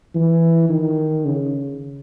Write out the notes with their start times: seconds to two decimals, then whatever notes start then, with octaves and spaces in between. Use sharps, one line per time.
0.15 E3
0.69 D#3
1.25 C#3